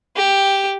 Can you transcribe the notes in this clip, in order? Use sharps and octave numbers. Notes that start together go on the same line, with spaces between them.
G4